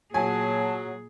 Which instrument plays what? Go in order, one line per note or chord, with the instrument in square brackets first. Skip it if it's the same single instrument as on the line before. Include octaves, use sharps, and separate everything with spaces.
[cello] A#2 G#4 [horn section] F#3 [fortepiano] G#5 [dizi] A5